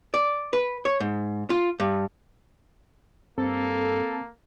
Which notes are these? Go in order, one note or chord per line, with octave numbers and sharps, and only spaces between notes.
D5
B4
C#5
G#2
F4
G2
G2 A#3 C4 A4